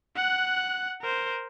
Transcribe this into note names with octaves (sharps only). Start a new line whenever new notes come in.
F#5 F#6
A#4 C5